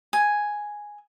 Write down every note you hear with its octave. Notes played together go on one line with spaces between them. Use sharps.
G#5